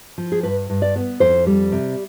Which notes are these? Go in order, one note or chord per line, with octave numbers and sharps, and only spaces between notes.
F3
G#4
G2 B4
G2
D5
B3
F2 C5
G3
C3